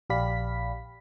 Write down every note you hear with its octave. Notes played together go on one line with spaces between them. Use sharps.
A#1 G4 D5 F5 B5 B6